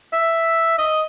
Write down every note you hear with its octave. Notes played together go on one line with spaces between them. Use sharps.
E5
D#5